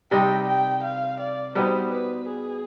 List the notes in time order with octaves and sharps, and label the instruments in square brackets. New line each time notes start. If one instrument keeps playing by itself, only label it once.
[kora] C3 G3 C4 D#4 [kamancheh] G5
[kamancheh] G5
F5
D5
[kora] B2 G3 B3 D#4 [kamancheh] C5
[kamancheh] B4
G#4